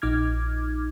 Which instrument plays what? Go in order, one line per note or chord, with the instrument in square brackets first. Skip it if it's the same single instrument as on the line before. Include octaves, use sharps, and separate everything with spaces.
[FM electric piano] A#1 D#4 D6 F6 G#6